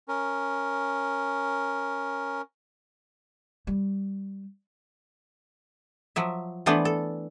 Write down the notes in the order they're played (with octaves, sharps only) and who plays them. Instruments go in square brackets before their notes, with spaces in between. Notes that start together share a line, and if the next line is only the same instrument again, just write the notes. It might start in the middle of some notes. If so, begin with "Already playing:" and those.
[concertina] C#4 A#4
[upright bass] G3
[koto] F3 F#3 E5
E3 A3 B3 D4 B4 C5
A4